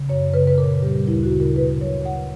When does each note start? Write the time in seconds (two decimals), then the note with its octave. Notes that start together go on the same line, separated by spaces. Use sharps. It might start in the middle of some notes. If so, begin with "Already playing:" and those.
Already playing: C#3
0.09 F#2 C#5
0.33 C#3 B4
0.47 B4
0.58 A#2 A#4
0.82 G3 G4
1.07 D2 E4
1.23 F#4
1.32 C#3
1.40 A#4
1.56 B2 B4
1.81 F#3 C#5
2.05 B2 F#5